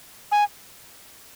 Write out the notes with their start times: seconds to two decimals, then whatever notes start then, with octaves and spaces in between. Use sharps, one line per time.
0.32 G#5